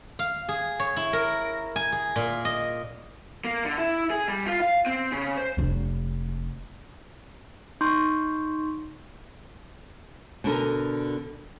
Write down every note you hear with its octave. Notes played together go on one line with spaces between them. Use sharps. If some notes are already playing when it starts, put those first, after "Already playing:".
F5
G#4
C#5
E4
A#4
G#5
G#4
A#2
D#5
A#3
D3
E4
G#4
G3
F4
F5
C4
C#3
C5
F1 D4
D#4 C6 C#6 G6
B2 D3 A#4